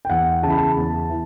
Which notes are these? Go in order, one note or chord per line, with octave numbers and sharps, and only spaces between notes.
G5
E2 F#5
C#3 E3 A5 B5
A5
E2
E3